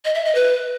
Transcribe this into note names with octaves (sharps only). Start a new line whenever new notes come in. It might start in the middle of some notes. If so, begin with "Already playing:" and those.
D#5
E5
D#5
B4